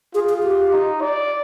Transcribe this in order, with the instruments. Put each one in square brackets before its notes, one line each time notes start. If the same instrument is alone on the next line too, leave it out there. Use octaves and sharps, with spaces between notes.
[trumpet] F4 [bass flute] G#4
[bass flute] G#4
G4
[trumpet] D#4
D5